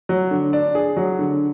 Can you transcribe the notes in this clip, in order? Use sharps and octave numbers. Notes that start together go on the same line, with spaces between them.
F#3
D3
D4
G#4
F#3
D3